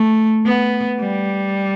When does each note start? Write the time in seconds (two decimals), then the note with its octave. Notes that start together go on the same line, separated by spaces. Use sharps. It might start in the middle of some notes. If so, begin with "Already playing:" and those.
Already playing: A3
0.46 B3
1.00 G3